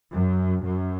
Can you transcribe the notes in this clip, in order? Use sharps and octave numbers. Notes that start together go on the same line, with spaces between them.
F#2
F#2